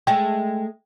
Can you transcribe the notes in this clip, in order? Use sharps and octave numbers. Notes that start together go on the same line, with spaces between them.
G#3 A3 G5